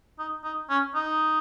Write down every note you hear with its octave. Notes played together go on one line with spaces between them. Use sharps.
D#4
D#4
C#4
D#4